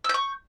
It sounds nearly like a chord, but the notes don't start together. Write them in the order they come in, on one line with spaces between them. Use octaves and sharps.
E6 G6 C#6